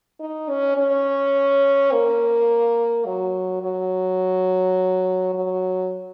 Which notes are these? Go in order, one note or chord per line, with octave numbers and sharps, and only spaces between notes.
D#4
C#4
C#4
A#3
F#3
F#3
F#3